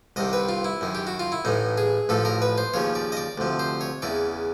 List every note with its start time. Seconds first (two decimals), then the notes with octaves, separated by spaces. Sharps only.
0.16 C2 C3 D#3 D#5
0.33 B4
0.49 F4
0.64 E4
0.81 F#2 D#3
0.95 G4
1.07 F#4
1.20 F4
1.32 E4
1.45 A1 A2 E3 D#4
1.78 G#4
2.09 A1 A2 F3 A4
2.25 A#4
2.42 B4
2.58 C5
2.74 D#2 C#3 F3 C#5
2.95 D5
3.12 D#5
3.17 D5
3.38 D2 C3 F3
3.59 C5
3.81 C#5
4.02 E2 C#3 E3 D5